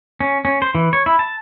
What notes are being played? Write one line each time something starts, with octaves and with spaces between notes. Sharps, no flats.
C#4
C#4
C5
E3
C#5
E4
A5